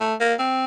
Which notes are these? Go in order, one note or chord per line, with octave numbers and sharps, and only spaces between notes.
A3
A#3
C4